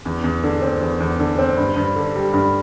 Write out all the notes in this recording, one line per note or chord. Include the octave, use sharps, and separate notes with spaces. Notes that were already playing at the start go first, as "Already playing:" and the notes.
E2
E2
D3
C4
E2
E2
D3
C4
G2
G2
D3
G3
G2